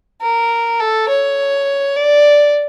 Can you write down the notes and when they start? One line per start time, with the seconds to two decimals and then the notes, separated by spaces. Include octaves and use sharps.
0.21 A#4
0.80 A4
1.09 C#5
1.96 D5